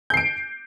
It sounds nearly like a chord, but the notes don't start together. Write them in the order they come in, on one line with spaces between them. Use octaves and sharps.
G6 C7 D7